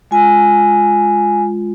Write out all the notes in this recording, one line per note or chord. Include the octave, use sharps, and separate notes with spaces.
G#3 F4 G#5